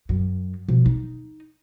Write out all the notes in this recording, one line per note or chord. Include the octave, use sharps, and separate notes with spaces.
F#2
B2 F3
D#4